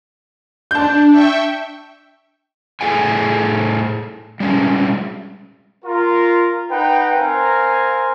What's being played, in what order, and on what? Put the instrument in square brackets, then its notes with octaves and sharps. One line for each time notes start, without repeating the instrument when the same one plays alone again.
[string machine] D4 [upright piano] A5 G6
[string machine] E5 G5 C#6
[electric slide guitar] A2 G#4 A4 F#5 G#5
G3 G#3 C#4
[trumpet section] F4 A#4
D#4 B4 F#5 G5
C4 A#4 F5 G#5 A#5 C6